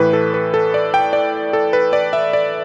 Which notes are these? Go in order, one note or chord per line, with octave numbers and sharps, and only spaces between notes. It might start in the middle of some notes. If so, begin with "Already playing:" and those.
Already playing: A2 E3 B4
A4
B4
A4
D5
G5
D5
A4
B4
D5
E5
D5